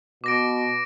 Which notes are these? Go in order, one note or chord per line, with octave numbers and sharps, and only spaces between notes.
B2 D6 A#6 D7